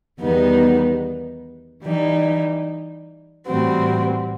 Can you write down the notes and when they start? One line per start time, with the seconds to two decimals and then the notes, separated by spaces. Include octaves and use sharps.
0.20 E2 D#3 G3 B3 D#4
1.82 E3 G3 D#4
3.47 A2 E3 G3 C4 F#4